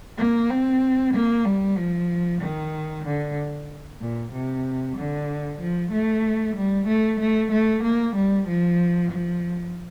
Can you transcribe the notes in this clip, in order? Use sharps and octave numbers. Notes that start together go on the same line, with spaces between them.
A#3
C4
A#3
G3
F3
D#3
D3
A#2
C3
D3
F3
A3
G3
A3
A3
A3
A#3
G3
F3
F3